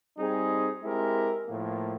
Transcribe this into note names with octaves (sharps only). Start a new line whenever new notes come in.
G3 C4 D#4 G#4
G#3 C4 E4 G4 A#4
A2 F3 A#3